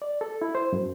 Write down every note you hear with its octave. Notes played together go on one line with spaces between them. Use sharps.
D5
A4
E4
C5
F#2